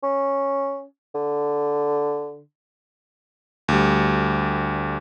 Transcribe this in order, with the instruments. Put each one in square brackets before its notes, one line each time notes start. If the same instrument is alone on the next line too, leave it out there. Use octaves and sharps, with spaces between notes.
[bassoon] C#4
D3
[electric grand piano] D2 G3